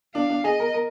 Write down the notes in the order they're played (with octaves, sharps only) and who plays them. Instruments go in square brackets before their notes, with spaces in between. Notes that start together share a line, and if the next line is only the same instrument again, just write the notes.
[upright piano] D4 [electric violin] F5
[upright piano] D4
[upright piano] G#4 [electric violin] D#5
[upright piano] A#4
A#4